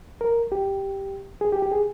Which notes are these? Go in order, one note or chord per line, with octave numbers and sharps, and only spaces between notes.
A#4
G4
G#4
G4
G4
G#4